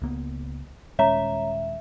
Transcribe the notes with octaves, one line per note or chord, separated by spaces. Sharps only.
C#2 A#3 B3
D#1 G#3 C#4 C#5 E5 A#5